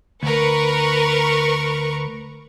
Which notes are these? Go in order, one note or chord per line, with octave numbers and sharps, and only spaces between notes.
D2 A#4 B4 C#6